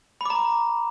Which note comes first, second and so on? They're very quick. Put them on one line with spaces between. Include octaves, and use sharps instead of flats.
B5 D6 A#5